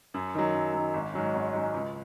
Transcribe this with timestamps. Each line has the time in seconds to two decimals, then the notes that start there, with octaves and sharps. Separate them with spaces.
0.14 F#2
0.35 D#3 F#3
0.54 F#2
0.74 D#3 F#3
0.94 G#1
1.13 G#2 F#3 C#4
1.34 G#1
1.53 G#2 F#3 C#4
1.74 C#2